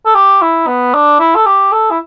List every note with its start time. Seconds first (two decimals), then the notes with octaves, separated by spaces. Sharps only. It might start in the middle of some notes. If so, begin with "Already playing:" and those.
0.06 A4
0.15 G4
0.42 E4
0.67 B3
0.94 D4
1.20 E4
1.35 A4
1.46 G4
1.72 A4
1.91 E4